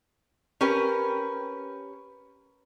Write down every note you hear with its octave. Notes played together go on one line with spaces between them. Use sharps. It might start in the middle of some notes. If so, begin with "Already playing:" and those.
C#4 G4 A#4 B4